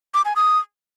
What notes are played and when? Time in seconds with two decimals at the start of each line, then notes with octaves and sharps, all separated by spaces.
0.14 D6
0.25 G#5
0.36 D#6